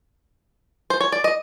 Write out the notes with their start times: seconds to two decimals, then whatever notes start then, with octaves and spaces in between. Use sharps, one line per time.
0.90 C5
1.01 C#5
1.12 D5
1.24 D#5